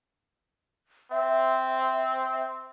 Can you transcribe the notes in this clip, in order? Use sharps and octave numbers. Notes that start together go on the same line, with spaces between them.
C4 E5